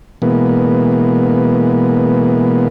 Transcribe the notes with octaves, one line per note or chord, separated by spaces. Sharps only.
B2 E3 G#3 A#3 B3